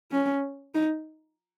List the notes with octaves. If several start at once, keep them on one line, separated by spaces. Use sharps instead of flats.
C#4
D#4